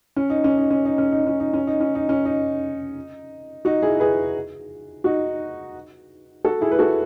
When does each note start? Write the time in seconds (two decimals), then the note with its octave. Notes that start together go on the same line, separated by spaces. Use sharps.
0.16 C#4
0.30 D#4
0.44 C#4
0.57 D#4
0.71 C#4
0.85 D#4
0.98 C#4
1.12 D#4
1.27 C#4
1.40 D#4
1.54 C#4
1.67 D#4
1.80 C#4
1.95 D#4
2.09 C#4
2.25 D#4
3.65 D#4 F#4
3.82 E4 G#4
4.00 G#4 B4
5.04 D#4 F#4
6.45 F#4 A4
6.61 E4 G#4
6.71 B4
6.79 F#4 A4